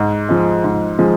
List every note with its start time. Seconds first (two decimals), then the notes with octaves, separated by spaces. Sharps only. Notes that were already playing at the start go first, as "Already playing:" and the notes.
Already playing: G#2
0.29 F3 G#3
0.64 G#2
0.99 F3 G#3